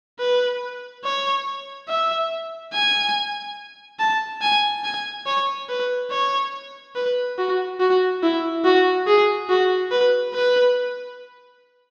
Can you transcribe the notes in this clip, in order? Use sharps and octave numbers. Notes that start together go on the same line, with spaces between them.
B4
C#5
E5
G#5
A5
G#5
G#5
C#5
B4
C#5
B4
F#4
F#4
E4
F#4
G#4
F#4
B4
B4